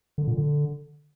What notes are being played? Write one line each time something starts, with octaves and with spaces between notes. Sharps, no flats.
D3
A#2
D3